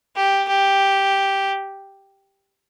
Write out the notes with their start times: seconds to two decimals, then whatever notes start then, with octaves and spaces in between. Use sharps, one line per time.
0.16 G4
0.48 G4